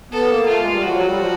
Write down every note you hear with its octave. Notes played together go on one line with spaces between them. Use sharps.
B3 A4
A#3
A3 F4
G#3
G3
F3 F#4
F#3
G3
F3